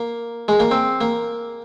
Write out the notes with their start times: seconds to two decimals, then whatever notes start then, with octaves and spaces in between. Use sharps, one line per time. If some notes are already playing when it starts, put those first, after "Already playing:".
Already playing: A#3
0.48 G#3
0.60 A#3
0.71 C4
1.01 A#3